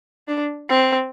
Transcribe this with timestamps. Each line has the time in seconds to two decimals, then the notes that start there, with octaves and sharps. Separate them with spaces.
0.28 D4
0.70 C4